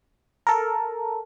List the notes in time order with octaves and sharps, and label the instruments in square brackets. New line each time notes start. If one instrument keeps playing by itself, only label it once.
[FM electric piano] A4 A#4